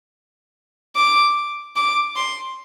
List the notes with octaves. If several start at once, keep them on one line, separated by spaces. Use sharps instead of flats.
D6
D6
C6